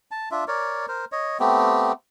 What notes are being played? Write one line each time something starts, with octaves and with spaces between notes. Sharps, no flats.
A5
D4 F4 E5
A#4 C#5 D5
A#4 C5
C#5 D#5
A3 B3 C4 G4